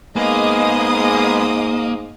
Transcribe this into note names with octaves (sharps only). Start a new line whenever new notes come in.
G#2 G#3 A#3 B3 D#5 F5 D#6